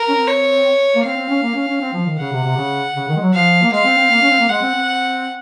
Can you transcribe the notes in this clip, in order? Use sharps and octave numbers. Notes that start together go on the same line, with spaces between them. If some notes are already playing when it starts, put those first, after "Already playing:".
Already playing: A#4
C#4
C4
C#5
A#3
C4 F5
C4
C#4
A#3
C#4
C#4
C4
F3
D#3
C#3 F#5
C3
C3
C#3
C#3
D#3
G#3
F#3
F3 F5
A#3
G#3 F5
C4
C4
A#3
C#4
C4
A#3
G#3 F#5
C4
C4